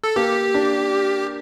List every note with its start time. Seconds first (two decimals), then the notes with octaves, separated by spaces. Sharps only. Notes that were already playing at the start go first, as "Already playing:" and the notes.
0.04 A4
0.16 A#3 G4
0.54 D4